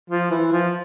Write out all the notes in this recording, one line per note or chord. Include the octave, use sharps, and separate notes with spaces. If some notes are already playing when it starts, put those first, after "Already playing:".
F3
E3
F3